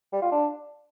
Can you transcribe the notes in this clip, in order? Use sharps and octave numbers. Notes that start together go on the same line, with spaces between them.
G3
F4
D4